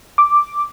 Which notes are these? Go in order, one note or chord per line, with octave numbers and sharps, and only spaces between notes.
D6